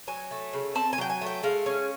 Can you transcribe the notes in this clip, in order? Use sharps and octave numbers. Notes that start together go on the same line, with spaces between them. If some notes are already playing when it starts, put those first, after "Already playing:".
F#3 G#5
A3
C#3
C4 A5
G#5
F#3 G5
G#5
A3
G5
G#3 F5
C#4